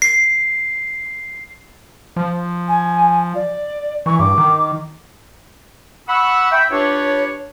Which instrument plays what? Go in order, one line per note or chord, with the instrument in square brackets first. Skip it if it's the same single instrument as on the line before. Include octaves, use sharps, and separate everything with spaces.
[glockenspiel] C7
[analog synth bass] F3
[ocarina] G#5
D5
[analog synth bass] E3 [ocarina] C#6
[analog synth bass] G2 [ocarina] D6
[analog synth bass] D#3
[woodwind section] F#5 B5 C#6 E6
E5 G5
D4 F4 G4 B4 C#5